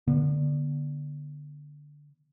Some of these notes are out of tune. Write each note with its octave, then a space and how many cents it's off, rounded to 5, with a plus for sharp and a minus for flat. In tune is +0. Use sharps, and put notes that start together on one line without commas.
D3 +0 B3 -35